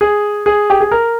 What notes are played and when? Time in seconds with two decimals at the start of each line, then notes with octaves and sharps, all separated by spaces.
0.01 G#4
0.46 G#4
0.70 G4
0.81 G#4
0.92 A#4